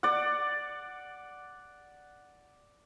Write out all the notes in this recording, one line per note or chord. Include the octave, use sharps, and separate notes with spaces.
D5 F#5